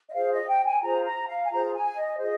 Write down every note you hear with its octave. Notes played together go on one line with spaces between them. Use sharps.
D#5
F4 G#4 C5 F5
D#5
G5
G#5
F4 G#4 C5 A#5
A#5
F5
G#5
F4 G#4 C5 A#5
G#5
D#5
F4 G#4 C5 D#5